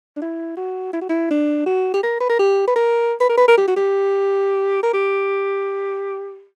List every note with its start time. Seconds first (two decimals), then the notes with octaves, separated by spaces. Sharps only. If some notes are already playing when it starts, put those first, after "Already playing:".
0.16 D4
0.22 E4
0.57 F#4
0.93 E4
1.01 F#4
1.09 E4
1.31 D4
1.66 F#4
1.94 G4
2.03 A#4
2.21 B4
2.30 A#4
2.39 G4
2.67 B4
2.76 A#4
3.21 B4
3.29 A#4
3.38 B4
3.48 A#4
3.58 G4
3.68 F#4
3.76 G4
4.83 A#4
4.93 G4